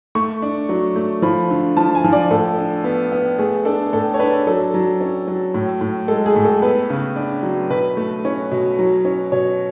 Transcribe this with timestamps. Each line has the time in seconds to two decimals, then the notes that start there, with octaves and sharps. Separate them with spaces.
0.15 A3 C#6
0.42 D4
0.69 F#3
0.96 A3
1.22 F3 B5
1.50 D3
1.77 F3 A5
1.95 G#5
2.04 F3
2.13 D5
2.31 A2 A4
2.57 D4
2.84 B3
3.12 B3
3.38 A3 G#4
3.65 D4 A4
3.93 A2 A4
4.14 C#5
4.19 D4 B4
4.47 F#3 A4
4.74 F#3
5.01 C#4
5.28 F#3
5.54 A2
5.81 A2
6.08 G#3 A4
6.26 G#4
6.36 A2
6.45 A4
6.62 B3 B4
6.90 C#3
7.16 D4
7.43 F#3
7.70 B2 B4
7.97 A3
8.25 C#4
8.51 B2
8.79 F#3
9.05 C#4
9.32 B2 C#5